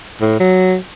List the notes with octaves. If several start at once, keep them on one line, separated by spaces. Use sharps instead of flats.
A2
F#3